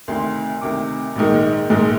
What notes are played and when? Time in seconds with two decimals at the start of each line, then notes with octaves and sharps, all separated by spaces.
0.08 D2 C3 D#3 C6
0.61 D2 C3 D#3 D6
1.16 A#1 G#2 D#3 G#3
1.70 A#1 G#2 D#3 G#3